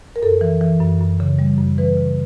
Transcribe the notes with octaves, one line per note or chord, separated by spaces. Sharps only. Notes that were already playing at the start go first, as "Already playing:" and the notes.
A#4
F#2 A4
E3
E3
F#2
F#2
C#3
G3
F#2
E3 B4
C#3